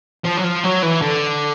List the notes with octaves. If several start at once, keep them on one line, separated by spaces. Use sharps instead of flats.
F3
F#3
F3
F#3
E3
D3